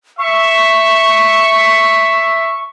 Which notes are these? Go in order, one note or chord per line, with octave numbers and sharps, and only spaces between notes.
E5 C#6